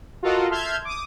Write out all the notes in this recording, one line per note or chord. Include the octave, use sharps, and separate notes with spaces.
F4 F#4 A4 A#4 D#5 F#5
E5 A5 C6 F6 G6 G#6
D6 D#6